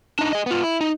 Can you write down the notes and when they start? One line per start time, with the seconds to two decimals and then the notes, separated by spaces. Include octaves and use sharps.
0.19 D4 D#4
0.33 G#4 D#5
0.46 B3 F4
0.64 E4
0.81 D#4